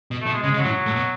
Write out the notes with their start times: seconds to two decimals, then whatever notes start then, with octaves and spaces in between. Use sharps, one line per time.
0.11 B2
0.21 A3
0.26 B2
0.33 G#3
0.43 C#3 G#3
0.54 C#3
0.59 F#3
0.65 A2
0.86 A2
0.96 B2